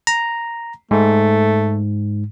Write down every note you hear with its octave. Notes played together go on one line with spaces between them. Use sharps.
A#5
G#2 A3